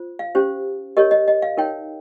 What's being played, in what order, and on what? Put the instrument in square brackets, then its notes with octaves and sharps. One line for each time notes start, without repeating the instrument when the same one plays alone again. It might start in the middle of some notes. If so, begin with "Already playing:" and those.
Already playing: [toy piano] F4 C5
F5
C#4 G4 C5
G4 A#4 C#5 D#5
D#5
D#5
F5
D#4 A#4 C#5 G5